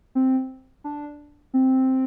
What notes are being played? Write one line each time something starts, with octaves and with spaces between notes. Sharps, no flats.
C4
D4
C4